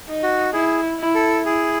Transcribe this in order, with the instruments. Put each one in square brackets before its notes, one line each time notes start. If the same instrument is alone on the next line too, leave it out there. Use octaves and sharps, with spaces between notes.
[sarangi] D#4
[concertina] F#4
[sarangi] E4 [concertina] G#4
[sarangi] E4
[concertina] A4
[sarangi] E4 [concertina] G#4